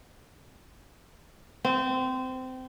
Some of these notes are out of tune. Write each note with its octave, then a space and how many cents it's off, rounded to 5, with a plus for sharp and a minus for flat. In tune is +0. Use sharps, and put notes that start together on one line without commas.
C4 -20